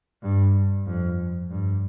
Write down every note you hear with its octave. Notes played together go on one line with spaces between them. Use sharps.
G2
F2
G2